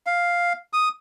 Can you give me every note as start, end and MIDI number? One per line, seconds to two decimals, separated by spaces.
0.06 0.53 77
0.73 0.89 87